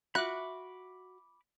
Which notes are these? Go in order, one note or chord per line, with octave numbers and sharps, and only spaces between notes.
F4 F#4 E5 B5 D6 F#6